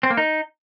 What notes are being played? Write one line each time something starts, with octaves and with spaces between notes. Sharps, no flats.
C4
A#3
D#4